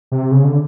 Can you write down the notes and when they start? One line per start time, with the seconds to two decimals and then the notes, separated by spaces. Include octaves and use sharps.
0.12 C3
0.31 C#3
0.44 D3